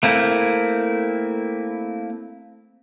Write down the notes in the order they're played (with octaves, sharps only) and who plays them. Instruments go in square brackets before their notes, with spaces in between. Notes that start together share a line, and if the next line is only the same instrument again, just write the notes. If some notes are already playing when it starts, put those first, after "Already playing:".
[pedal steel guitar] A3 A#3 C4 E4